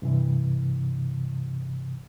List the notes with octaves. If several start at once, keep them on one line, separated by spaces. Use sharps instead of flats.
G2 C3 E3